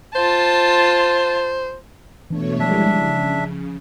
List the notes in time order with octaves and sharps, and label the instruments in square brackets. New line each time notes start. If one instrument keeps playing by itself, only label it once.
[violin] F4 A5 [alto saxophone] C5
[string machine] B2 A3 C#5 [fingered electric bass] E3 D4
[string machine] E3 G3 G#3 [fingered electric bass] F3 [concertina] D4 E5
[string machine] C#3